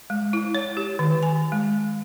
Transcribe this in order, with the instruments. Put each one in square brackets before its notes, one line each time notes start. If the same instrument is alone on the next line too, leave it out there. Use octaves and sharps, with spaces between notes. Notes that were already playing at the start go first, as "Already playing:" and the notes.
[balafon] G#3
E4
C#5
G4
D#3
G#5
G#3